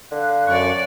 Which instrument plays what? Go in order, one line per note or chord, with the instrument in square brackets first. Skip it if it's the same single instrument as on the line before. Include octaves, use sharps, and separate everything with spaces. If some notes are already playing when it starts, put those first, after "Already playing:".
[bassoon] D3 [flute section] F5 F#6
[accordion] F#2 C#6 [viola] C#5 D5